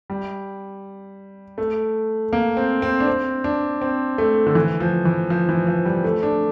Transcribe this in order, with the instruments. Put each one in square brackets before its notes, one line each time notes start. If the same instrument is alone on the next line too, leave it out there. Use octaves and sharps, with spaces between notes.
[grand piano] G3
A3
A#3
C4
C4
D4
C4
D4
C4
A3
D3
E3
F3
E3
F3
E3
F3
G3
A3
D4